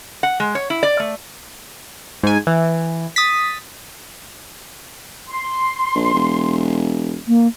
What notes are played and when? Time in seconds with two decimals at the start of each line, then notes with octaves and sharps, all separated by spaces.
0.23 F#5
0.40 G#3
0.55 C#5
0.70 E4
0.83 D5
1.00 A3
2.23 G#2 G#5
2.47 E3
3.16 D#6 A6 B6
5.27 C6
5.95 A#1
6.14 E1
7.28 A#3